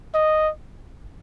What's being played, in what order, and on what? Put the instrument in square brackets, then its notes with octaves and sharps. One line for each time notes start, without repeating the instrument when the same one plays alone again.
[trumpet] D#5